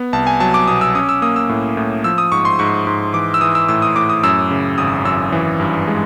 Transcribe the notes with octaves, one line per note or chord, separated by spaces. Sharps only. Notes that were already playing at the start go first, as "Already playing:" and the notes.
Already playing: B3
C2 A5
G#5
F#3 A5
D6
B2 D#6
E6
C#4 D#6
E6
A#3 D#6
E6
A2
A2
F3 E6
D#6
G#2 C#6
C6
G#2 C#6
G#2
E3 D6
E6
E3 D#6
E6
A2 E6
D#6
A2 D6
D#6
F#2 E6
C#3
G#1 D#6
F#2 E6
E3
G2
G#3